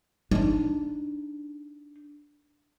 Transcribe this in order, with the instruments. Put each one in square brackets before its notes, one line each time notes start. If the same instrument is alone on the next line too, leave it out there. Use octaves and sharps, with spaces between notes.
[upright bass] D4 D#4